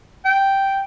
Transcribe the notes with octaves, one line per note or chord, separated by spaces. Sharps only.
G5